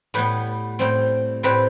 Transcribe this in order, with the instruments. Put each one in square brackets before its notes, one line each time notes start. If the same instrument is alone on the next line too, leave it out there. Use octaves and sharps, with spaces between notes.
[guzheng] A2 G3 B3 B4
A2 G3 C4
A2 G3 C4 B4